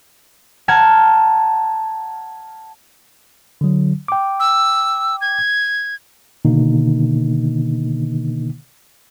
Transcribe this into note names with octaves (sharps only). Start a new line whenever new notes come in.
F#5 A5 A#5 F6 G#6
D3 F#3
G5 D6
E6
G#6
B2 D3 D#3 A#3 D#4